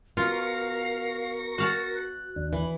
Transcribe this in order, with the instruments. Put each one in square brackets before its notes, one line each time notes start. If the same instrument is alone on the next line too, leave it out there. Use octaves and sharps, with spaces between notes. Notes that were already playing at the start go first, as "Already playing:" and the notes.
[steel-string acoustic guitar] B2 [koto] F4 [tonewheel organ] A#4 C#6 A#6 [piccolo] F5
[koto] F#4 F5 A5
[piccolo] F#6
[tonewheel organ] D#2 D4
[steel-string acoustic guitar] E3 [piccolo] B5